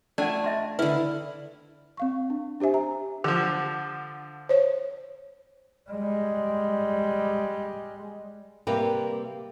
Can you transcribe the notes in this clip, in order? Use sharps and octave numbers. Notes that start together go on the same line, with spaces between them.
A3 D4 F4 D5 F#5 G#5
D#5 E5 C6
D3 E4 B4
C4 F5 C#6
D4
D4 G4 C5 E5 G#5
A#5
D3 F3
C5 C#5
G3 G#3
C3 G3 A#3 G4 A#4 B4